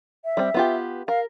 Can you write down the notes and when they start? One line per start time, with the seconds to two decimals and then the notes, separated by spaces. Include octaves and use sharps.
0.25 E5
0.37 G3 C4
0.54 B3 F4 G4
1.08 A#4 F5